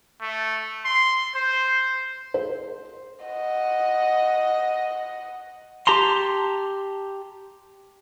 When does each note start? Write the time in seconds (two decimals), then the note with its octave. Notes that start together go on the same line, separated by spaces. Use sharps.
0.21 A3
0.85 C6
1.35 C5
2.34 C5
3.25 D#5 F#5
5.87 G4 A5 A#5 C6